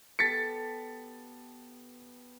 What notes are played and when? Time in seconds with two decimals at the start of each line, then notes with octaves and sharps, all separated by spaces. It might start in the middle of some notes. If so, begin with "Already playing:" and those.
0.19 B3 G4 A4 A6 B6 C#7